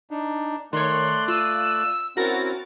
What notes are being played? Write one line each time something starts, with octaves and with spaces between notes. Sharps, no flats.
D4 D#4
D#3 A3 C#5 D5 C6 F#6
F4 E6 D#7
C4 C#4 E4 F#4 A#4 A6 A#6